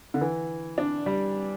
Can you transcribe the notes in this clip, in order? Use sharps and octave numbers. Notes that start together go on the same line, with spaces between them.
D3
E3
D4
G3